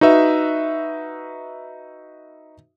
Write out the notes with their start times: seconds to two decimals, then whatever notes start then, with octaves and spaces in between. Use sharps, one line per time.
0.01 D#4 F#4 B4 E5